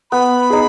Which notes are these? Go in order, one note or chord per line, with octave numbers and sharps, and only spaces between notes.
B3 B5
D#4 G#4